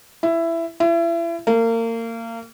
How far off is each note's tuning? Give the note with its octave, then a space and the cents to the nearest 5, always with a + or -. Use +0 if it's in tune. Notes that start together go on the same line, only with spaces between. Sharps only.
E4 +15
E4 +35
A#3 -30